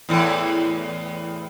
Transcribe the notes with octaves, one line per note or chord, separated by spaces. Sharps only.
E2 A2 E3